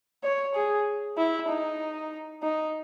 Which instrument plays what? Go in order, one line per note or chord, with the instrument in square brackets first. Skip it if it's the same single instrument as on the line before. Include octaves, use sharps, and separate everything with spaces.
[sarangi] C#5
G#4
E4
D#4
D#4